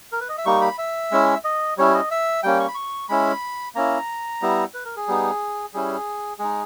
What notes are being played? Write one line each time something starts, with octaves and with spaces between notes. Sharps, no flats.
A#4
B4
D#5
E5
G3 A#3 D#4 C#6
B5
E5
G#3 C#4 E4
D#5
G3 C#4 E4 C#5
D#5
E5
G3 A#3 C#4 G5
C#6
B5
C#6
G#3 C#4 E4 B5
A#3 C#4 E4 A#5
G3 B3 E4
B4
A#4
G#4
G3 B3 D#4
G3 C#4 E4 G#4
G#3 D#4 G#4